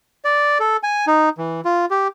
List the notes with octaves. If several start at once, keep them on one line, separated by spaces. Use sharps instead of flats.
D5
A4
G#5
D#4
E3
F4
G4